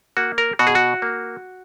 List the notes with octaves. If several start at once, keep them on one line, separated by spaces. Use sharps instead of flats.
A#3 F#4
A#4
B2 F#4
G#4
F#4
A#3